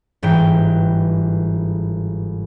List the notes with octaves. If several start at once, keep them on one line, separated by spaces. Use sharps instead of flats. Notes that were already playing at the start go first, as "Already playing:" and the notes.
G1 G#2 E3 G5 D7